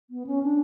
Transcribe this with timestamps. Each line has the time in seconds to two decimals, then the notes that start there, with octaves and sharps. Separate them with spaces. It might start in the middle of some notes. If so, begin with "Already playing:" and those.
0.10 B3
0.27 C#4
0.43 D4